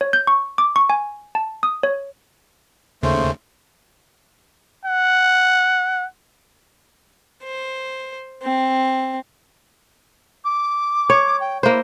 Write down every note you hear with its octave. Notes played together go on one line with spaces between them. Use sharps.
C#5
G6
C#6
D6
C#6
G#5
A5
D#6
C#5
D#2 C#3 A3 C5
F#5
C5
C4
D6
C#5
G5
A#3 E4 C5